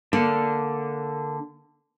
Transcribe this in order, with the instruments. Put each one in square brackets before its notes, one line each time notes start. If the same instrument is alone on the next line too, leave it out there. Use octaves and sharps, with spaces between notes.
[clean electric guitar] D3 [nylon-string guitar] A#3